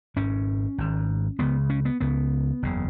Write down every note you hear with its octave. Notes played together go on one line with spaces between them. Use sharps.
G#1 G#2 C#4
G#1 G#2
C#2 C#3 B3
C#4
B3
C#2 C#3 B3
F#1 E2 C#3